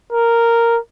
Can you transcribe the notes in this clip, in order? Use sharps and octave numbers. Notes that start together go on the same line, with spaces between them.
A#4